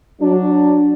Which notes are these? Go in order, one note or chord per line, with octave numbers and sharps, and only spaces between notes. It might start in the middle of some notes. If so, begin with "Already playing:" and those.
F#3 D4